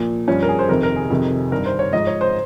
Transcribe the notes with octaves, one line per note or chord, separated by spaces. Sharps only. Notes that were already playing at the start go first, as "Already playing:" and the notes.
Already playing: A#2 F3
G2 F3 C#4
A#4
G#4
C5
F2 C3 D#3 A#4
A#4
G#4
F2 C3 D#3
G2 D#3 A#4
C5
C#5
G#2 F3 D#5
C#5
C5